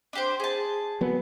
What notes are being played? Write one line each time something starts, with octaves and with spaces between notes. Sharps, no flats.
D4 G4 C5
G#4 A5
F#3 B3